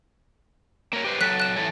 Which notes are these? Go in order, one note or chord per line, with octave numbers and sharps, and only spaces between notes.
A#3 A#4 C#5
G4 B4 C5
F#3 A4 F#6 B6
F#6 E7
E3 A4 C#5